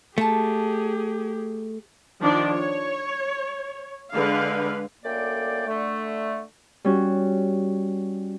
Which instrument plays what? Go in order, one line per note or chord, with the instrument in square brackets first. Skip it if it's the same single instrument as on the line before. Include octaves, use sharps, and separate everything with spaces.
[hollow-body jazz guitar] A3 [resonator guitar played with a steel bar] A#3 G#5 A5 [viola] G4 G#4
[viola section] D#3 F3 D4 D5
C#5
D3 G#3 B4 F5
[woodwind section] F#2 D3 A3 A#3 D5 G5
D3 A3
[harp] G3 C#4 F#4